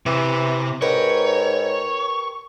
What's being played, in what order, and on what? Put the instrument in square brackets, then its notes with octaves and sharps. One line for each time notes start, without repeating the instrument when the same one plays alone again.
[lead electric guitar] C3 [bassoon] E3
[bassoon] G#2 [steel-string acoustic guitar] G4 A#4 B4 [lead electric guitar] C#5